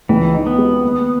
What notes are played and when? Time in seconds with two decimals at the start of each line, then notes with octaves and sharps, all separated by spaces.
0.09 C#2 E3
0.35 D#4
0.47 B3
0.58 G#3
0.83 D#2